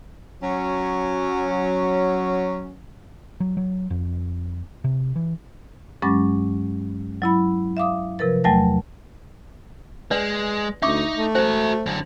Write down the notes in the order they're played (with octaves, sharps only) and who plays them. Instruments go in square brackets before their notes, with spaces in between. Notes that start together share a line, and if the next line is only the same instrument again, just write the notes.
[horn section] F#3 C#4
[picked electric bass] F#3
F#3
F2
C3
E3
[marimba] G2 F#3 G#3 C#4 D6 A6
F#3 E4 B5
E5 F5 D6 D#6
C3 F3 A#4 B4 A6
E2 F#3 A3 G5 A5 A#6
[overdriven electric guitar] G#3 [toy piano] B4 D5
[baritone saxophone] D2 [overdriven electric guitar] D#4 [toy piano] E5 C#6 D6
[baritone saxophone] A3
[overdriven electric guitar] F#4 E5 [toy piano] C5
[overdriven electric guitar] F#2 D3